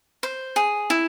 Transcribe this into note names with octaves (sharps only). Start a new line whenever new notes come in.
C5
G#4
E4